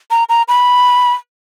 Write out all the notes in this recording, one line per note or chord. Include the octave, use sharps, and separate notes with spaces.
A#5
A#5
B5